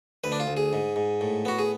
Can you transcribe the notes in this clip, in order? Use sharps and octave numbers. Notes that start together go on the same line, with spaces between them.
D2 B4
D4
F4
D2
G#4
G#2
G#2
A2
B3 F#4
G#4